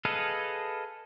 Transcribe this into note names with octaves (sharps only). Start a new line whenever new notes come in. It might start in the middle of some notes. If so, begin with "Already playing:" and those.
G#4 A4 B4 D#5 F5